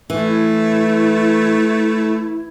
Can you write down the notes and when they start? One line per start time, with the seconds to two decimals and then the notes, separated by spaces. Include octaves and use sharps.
0.10 E3 A3 E4